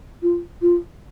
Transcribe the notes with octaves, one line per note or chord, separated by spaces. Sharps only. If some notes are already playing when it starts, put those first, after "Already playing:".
F4
F4